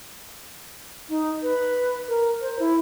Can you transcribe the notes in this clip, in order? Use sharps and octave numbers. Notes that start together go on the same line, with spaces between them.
D#4
B4
A#4
C5
E4